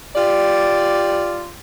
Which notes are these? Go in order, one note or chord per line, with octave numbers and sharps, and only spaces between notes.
F4 G4 D5